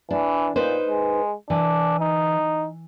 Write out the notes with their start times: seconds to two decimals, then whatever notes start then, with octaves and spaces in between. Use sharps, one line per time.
0.11 E3 D4
0.56 A#2 D#4 B4 C5
0.88 G#3
1.50 E3 D4
2.00 D#4